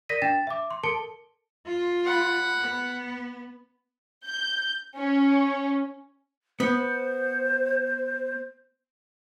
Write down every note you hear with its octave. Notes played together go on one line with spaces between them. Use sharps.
A#4 D5 A#6 B6 D#7
D4 G5 A6 E7
E5 D6
C6
A4 A#4 A5 C#7 D7 G7
F4
F#5 B5
B3
G6
C#4
B3 C5